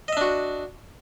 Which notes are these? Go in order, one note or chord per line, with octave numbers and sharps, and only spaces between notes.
D4 F#4 D#5 E5